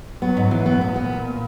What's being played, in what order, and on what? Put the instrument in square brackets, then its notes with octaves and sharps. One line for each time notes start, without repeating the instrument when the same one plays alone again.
[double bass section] F#3 [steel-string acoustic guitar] B3
[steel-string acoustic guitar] G#2
E3
B3
[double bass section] A#2 [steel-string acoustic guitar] B3
[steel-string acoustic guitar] B3